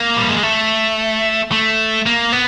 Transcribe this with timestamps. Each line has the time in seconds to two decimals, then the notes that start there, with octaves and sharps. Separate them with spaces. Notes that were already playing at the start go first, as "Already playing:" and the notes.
Already playing: A#3
0.17 G3
0.29 G#3
0.43 A3
1.52 A3
2.06 A#3
2.32 B3